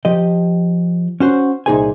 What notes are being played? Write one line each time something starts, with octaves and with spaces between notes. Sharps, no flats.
F3 G4 D#5
C#4 F#4 C5
C2 A#2 D#4 G#4 C5 G#5